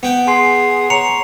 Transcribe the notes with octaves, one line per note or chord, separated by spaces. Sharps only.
B3 G5
G#4 G#5 C6 C7
C#5 A#5 C#7 F7